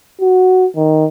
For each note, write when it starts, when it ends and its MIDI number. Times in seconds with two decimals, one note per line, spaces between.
0.21 0.66 66
0.77 1.06 51